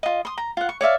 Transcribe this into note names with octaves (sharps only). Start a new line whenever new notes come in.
F4 D#5
C6 D#6
A#5
F4 F#5
C#6
C#5 D5 E5 F5